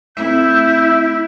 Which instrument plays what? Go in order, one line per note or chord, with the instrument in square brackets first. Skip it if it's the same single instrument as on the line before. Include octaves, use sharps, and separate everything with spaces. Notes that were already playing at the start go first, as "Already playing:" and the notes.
[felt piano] A3 C4 [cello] E4 [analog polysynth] E5 [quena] G6